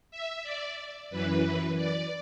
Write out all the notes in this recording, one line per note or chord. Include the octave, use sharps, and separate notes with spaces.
E5
D5
F#2 E3 B4
D5